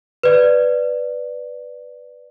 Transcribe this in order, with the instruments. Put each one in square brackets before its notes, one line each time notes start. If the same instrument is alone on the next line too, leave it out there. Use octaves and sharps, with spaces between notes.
[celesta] B4 D5